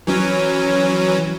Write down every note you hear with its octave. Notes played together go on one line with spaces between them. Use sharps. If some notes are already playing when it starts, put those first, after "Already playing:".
E3 F#3 C#4